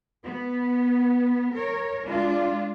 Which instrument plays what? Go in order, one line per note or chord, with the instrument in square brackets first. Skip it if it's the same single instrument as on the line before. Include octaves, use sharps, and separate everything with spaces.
[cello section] B3
A#4 C#5
G#3 D4 F4